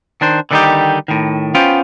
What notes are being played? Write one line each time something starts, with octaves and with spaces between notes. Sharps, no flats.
D#3 D4 C5
D3 D#3 G3 D4 D#4 G4
A2 D#3
B3 C#4 F4 C5 G5